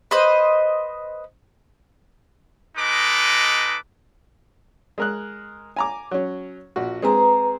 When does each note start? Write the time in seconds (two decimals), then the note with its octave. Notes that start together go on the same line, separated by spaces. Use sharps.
0.11 B4 C5 D#5
2.77 G#3 D#4 A4 B4 D6
4.98 G#3 A#4 F#6
5.76 G#5 A#5 D6
6.11 F#3 C#4
6.76 A#1 F#4
7.02 G#3 C4 G#4 B4 A#5